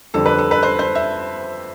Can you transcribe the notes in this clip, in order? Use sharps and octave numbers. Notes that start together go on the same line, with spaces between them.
F2 D3 G3 A4
B4
A4
B4
C5
C5
E5